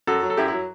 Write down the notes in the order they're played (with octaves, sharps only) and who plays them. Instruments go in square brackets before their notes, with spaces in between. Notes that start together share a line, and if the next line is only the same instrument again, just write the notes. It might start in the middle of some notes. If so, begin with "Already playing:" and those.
[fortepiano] F#2 F#4 A4
F#3
A4
F#2 E4 G4
E4
F#3